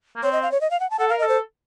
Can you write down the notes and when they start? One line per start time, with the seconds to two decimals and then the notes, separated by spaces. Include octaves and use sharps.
0.16 A#3
0.23 C4 C#5
0.33 D#5
0.43 F5
0.52 C#5
0.61 D#5
0.71 F5
0.80 F#5
0.90 A5
0.99 A4 F#5
1.09 A#4 F5
1.19 A4 D#5
1.29 C5